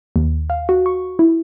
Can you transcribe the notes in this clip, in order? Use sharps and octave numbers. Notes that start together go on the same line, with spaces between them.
D#2
F5
F#4
C#6
E4